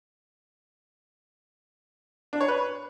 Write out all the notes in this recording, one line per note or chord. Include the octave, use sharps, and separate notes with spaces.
D4
C#5
B4